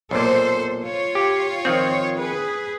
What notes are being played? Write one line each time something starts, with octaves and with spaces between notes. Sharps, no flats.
B1 A#2 A4 C5
F4 C#5
G4
D#3 F3 C4
G#4 B4